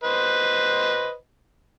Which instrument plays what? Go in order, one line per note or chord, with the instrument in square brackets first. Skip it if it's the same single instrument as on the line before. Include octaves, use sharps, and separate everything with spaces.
[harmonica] B4 C5 D#5